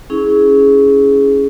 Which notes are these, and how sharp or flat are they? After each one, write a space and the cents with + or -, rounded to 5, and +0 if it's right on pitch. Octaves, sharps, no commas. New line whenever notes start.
C#4 +5 E4 -25 G#4 +5